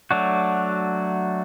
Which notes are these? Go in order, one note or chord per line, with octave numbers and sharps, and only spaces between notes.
F#3 A3 D4 F#4